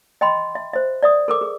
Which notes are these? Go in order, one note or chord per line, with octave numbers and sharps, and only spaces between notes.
D#5 G5 B5 C6
E5
C5 E5
D5 E5 D#6
A4 A#4 D6
G#4